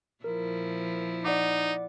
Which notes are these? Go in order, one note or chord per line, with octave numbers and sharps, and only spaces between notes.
A#2 F3 E4 A#4
D#4 D5 F#5 D6